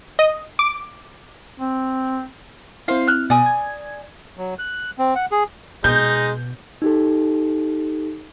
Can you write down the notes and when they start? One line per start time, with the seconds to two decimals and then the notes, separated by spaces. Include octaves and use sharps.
0.19 D#5
0.59 D6
1.58 C4
2.88 C4 E4 C5 F5
3.07 F6 F#6
3.30 B2 D5 G#5 D#6
3.46 G#6
4.38 F#3
4.59 F#6
4.99 C4
5.15 F#5
5.32 G#4
5.84 B2 G#3 D#4 G6
6.82 D#4 G4 A4